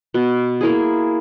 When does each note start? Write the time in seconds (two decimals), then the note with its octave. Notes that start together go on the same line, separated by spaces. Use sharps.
0.14 B2
0.61 A#3 E4 G#4